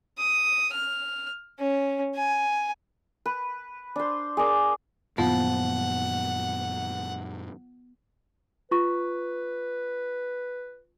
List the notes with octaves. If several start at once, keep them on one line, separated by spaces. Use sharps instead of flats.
D#6
F6
C#4
G#5
B4
D4 C5
G#4 A#4 D5
F#2 A#2 D#3 F3 B3 F#5
F4 B4 C#6